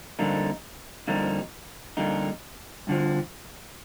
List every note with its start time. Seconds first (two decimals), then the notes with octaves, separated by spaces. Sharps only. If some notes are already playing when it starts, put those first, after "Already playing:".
0.19 F2 D3 G3 A#3 D#4
1.07 F2 D3 G3 A#3 D#4
1.97 F2 D3 G3 A#3 D#4
2.87 G2 D3 F3